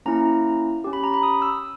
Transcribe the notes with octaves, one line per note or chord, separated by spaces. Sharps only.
A#3 C#4 E4 A#5
C#4 G4
B5
A#5
B5
D#6
E6